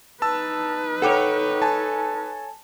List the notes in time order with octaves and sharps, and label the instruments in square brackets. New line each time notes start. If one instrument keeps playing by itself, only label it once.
[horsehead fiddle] D#4 B4 [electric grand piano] A5 E6
[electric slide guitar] A4 C#5 [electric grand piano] F#5 G5 D6
[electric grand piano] G#5 A5